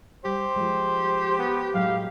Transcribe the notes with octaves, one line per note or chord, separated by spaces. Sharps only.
G3 G4 C5
F3 G#3
B3
A2 F#3 G#3 F5